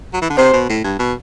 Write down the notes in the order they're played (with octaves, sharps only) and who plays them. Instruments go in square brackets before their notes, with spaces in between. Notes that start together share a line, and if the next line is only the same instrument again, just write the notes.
[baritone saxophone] F#3
E3
D3
[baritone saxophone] C3 [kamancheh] C5
[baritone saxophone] B2
A2
G2
B2